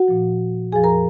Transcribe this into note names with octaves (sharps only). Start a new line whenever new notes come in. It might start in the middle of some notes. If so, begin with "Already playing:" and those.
Already playing: F#4 F#5
A#2 F3
F2 F3 G#4 G#5
A#4 A#5